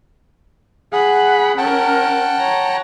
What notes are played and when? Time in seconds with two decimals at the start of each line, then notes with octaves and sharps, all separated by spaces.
0.93 G#4 F#5 B5
1.58 C#4 A#4 F#5 G5 A5
2.39 C#5 A#5